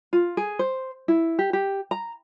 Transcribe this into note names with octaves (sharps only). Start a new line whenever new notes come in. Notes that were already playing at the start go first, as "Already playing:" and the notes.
F4
G#4
C5
E4
G4
G4
A#5